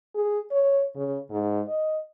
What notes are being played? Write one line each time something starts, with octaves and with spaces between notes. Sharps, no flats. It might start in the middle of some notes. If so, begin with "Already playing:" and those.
G#4
C#5
C#3
G#2
D#5